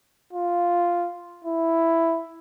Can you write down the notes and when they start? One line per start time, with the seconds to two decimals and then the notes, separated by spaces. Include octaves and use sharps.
0.33 F4
1.44 E4